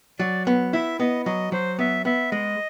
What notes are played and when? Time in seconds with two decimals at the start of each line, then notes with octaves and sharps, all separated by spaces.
0.19 F#3 D5
0.47 B3
0.73 E4 E5
1.00 B3 D#5
1.26 F#3 D#5
1.52 F#3 C5
1.79 B3 E5
2.05 B3 E5
2.32 G#3 D#5